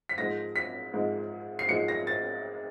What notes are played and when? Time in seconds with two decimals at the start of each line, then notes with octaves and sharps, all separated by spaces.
0.09 B6
0.18 G#2 F3 G#3 A#6
0.56 B6
0.94 G#2 F3 G#3
1.59 C7
1.68 G#2 F3 G#3 C#7
1.88 A#6
2.07 A6